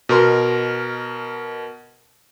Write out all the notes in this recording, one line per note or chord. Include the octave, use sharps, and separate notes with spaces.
B2 A#4 C6